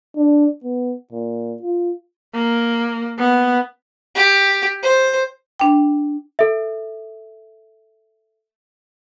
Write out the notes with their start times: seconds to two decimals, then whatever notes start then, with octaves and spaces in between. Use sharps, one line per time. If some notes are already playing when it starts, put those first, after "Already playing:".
0.17 D4
0.64 B3
1.12 A#2
1.62 F4
2.35 A#3
3.19 B3
4.15 G4
4.83 C5
5.60 D4 G5
6.39 A4 E5